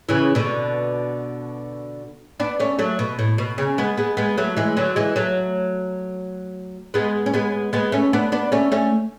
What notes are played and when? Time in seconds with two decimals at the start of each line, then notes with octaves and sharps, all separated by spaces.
0.09 C#3 E3
0.35 B2 D3
2.40 B3 D4
2.60 A3 C#4
2.79 F#3 A3
2.99 B2
3.19 A2
3.38 B2
3.58 C#3
3.78 G#3 B3
3.97 G#3 B3
4.17 G#3 B3
4.38 F#3 A3
4.57 E3 G#3
4.77 D3 F#3
4.96 E3 G#3
5.16 F#3 A3
6.94 G#3 B3
7.26 C#4
7.34 G#3 B3
7.73 G#3 B3
7.92 A3 C#4
8.13 B3 D4
8.32 B3 D4
8.52 A3 C#4
8.72 A3 C#4